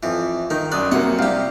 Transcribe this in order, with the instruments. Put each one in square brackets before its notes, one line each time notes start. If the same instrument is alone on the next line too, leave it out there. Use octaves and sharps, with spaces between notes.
[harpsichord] F2 E3
[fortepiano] D#3 [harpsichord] D#4
[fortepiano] F#2 D#6 F#6 [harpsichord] D5
[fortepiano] C3 F#3 A#3 [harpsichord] F#5
[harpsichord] C2 G4 [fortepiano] F5